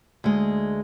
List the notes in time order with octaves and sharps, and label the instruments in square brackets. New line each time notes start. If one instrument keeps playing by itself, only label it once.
[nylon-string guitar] D2 G#3